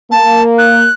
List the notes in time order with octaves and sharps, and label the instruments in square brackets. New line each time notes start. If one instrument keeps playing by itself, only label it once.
[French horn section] A#3 [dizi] A5
[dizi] F#6